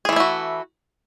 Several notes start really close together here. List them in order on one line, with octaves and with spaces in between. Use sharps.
G#4 E3 A3 E4 F#4